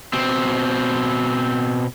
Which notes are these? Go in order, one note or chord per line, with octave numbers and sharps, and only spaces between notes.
B2 C4